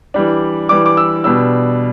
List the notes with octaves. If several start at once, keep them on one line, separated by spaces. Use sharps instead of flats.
E3 G3 D4
E3 G3 D4 D6
D6
E6
B2 G3 D4 E6